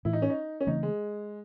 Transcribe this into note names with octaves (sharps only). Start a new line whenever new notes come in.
A2 E3 A3 E4
D#4
C#4
D#4
C#4
C#3 E3 A3 C4 D#4
G#3